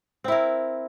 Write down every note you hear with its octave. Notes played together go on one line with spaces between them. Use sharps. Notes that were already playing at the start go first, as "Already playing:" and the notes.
C4 E4 A#4